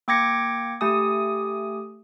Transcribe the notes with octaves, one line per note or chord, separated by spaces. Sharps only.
A#3 G5 D6 G#6 A#6 C#7
A3 G4 G#5 D#6